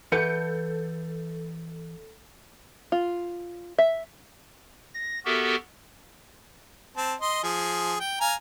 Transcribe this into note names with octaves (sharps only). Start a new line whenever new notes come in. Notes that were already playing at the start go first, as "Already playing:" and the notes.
E3 A4 B4 F#5 G6 C#7
F4
E5
A#6
B3 F#4 G4 A4 A#4 E5
C4 A5
D#5 C6
F3 G#4
G5
F5 G#5 A#5